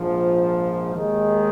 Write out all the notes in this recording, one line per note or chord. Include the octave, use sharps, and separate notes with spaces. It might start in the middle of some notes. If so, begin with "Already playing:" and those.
Already playing: A#1 G#2 F3
D#2 D#3 G#3